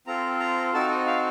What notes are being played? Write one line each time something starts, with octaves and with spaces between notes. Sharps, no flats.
C4 F4 A4 A#5
A#5
C4 D#4 F#4 A4 A5
D#5
F5